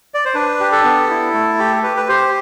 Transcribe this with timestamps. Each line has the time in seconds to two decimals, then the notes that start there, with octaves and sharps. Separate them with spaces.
0.14 D5
0.25 C5
0.35 D4 B4
0.60 G4
0.72 A4
0.84 B3
1.10 E4
1.34 A3
1.59 G4
1.83 G4 B4
1.97 B4
2.08 G4 C5